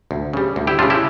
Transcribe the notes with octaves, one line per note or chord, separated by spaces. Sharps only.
D2
C#3 G3
D2
E4 G4
C#3 G3 D4 F4
E4 G4